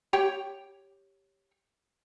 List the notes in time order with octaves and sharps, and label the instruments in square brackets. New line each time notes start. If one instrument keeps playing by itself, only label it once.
[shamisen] G4 C#5 G5